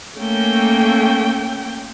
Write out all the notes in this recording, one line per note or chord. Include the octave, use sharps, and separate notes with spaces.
A3 A#3 C#4 G5